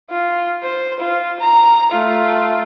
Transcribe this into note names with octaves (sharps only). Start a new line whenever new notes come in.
F4
C5
F4
A#5
A3 F4